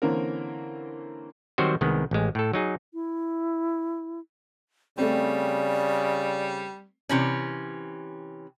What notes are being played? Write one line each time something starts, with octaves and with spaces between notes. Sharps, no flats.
D3 E3 A#3 C4 C#4 A#4
D#3 F#3 G3 C4 F#4 C5
C2 D#3 G#3 B3
A1 G#3
A2 A4
F#3 D#4 G#4
E4
C#3 G3 A3 C4 D5
C3 E3 C#4